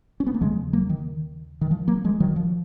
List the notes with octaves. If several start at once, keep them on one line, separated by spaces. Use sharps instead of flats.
C#4
B3
A#3
D#2 C#3 F3 G#3
F#3 A#3
D#3
D#3
F3
F#3 A#3
F3 G#3
D#3 F#3
F3